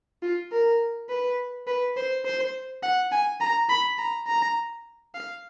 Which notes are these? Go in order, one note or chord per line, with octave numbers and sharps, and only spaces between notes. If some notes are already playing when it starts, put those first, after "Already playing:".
F4
A#4
B4
B4
C5
C5
F#5
G#5
A#5
B5
A#5
A#5
F5